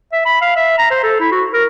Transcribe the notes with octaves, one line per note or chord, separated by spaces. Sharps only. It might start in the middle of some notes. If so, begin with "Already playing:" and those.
E5
B5
F5
E5
A#5
C5
A4
E4
F#4
A#4